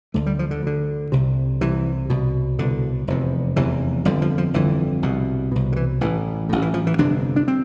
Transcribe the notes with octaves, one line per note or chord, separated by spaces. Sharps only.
D2 D3 A3
G3
F3
D3
D2 D3
C2 C3
C2 C3 E3
C2 B2
C2 B2 D3
F1 E2 C3
F1 E2 C3 E3
G1 F2 D3 G3
F3
F3
G1 F2 D3 E3
C2 B2
C2 B2
D3
E3
A1 A2 E3
A1 A2
E3
F3
E3
G1 F2 C3 D4
D4
C4